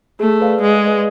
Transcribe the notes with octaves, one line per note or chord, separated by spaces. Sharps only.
A3 G#4
B4 D5 F5
G#3 G#4
B4 D5 F5